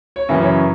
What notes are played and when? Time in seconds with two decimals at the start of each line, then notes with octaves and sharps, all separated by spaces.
0.16 C#5
0.29 F#2 C#3 E3
0.42 C#5